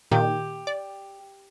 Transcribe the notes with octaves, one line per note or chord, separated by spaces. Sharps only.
A#2 D#3 G4
D5